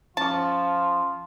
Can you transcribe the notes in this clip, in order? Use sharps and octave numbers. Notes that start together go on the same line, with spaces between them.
F3 C#4 F4 A5 C#6